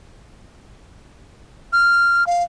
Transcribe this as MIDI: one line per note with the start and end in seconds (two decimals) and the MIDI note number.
1.73 2.26 89
2.27 2.43 77